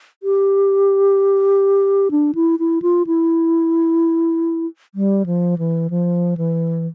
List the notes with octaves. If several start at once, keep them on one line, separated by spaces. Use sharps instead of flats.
G4
D4
E4
E4
F4
E4
G3
F3
E3
F3
E3